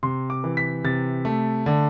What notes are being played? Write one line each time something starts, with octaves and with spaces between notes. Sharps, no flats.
C3 C6
D6
E3
B6
C3 A6
A3
D3